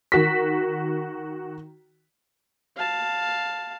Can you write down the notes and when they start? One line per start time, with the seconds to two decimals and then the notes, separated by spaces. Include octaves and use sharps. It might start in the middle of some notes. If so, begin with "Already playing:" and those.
0.12 D#3 F#4 B6
2.77 F5 A5